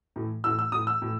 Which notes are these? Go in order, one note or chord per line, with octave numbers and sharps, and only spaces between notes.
A2 E3
A2 E3 E6
E6
A2 E3 D#6
E6
A2 E3